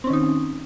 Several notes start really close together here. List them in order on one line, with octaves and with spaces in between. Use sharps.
C4 C#4 D#3 D#4